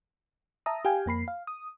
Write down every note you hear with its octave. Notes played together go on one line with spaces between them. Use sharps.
E5 A5 A#5 D#6
G4 F5 G5 G#5
F2 A#3 B5 C7
F5
D#6